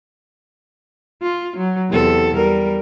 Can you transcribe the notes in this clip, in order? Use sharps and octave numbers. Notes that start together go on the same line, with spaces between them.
F4
F#3
E2 C3 A4
G3 A#4